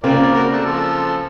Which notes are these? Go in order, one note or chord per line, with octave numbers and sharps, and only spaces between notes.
C#3 A#3 C4 F4 A#4 D5
F#4 A#4
A3 D4
F3 A4